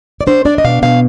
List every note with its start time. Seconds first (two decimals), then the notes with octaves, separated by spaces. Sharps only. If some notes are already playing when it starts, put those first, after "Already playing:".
0.21 D5
0.27 D4 C5
0.45 D4 D5
0.58 D#5
0.64 B2 F5
0.82 B2 F5